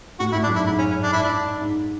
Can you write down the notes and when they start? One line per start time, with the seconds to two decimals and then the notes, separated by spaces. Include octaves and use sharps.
0.20 A2 F#4
0.32 E4
0.35 A2
0.43 D4
0.47 F#2
0.51 G#2 E4
0.67 G#2 E4
0.79 C#4
0.91 C#4
1.02 D4
1.13 E4
1.23 D4
1.61 G#2